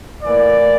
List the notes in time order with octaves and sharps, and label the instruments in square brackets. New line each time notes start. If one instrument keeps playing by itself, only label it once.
[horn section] A2 E3 A#3 D5